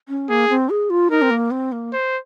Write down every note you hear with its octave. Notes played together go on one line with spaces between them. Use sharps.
C#4
A#3 G#4
C4
G#4
F4
D#4 A#4
C4
A#3
C4
A#3
C5